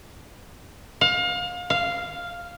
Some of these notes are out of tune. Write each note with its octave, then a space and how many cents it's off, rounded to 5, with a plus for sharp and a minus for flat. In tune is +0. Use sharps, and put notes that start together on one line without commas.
F5 +30
F5 -5